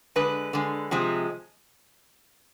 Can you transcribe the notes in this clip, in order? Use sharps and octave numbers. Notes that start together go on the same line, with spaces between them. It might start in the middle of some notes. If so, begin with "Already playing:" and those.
D3 G#3 B4
D3 G#3
C3 F3 G#3